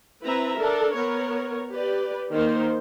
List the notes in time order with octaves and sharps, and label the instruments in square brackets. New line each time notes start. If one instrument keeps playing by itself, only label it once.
[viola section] C4 E4 B4 E5 A#5
D4 A4 A#4
B3 A#4 C#5
G4 B4 D5
D#3 A#3 D#4 A#4 C5